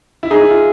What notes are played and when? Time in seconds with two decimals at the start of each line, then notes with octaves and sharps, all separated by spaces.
0.23 E4
0.31 D#4 G#4
0.41 E4
0.51 F4